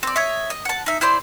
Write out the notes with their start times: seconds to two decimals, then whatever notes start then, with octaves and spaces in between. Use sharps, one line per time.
0.03 C4 D5
0.16 C#5 D#5 E5
0.50 D#5
0.65 F#5 A5
0.86 D#4 E5
1.01 E4 C5 D5 C6